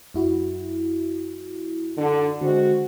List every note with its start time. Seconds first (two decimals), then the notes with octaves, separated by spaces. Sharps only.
0.14 F#2 E4 F#4
1.98 D3
2.41 D3 G#3 C4 F#4